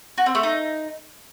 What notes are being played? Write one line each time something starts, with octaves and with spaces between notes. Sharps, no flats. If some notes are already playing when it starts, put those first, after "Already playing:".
F#4
C4
A3
D#4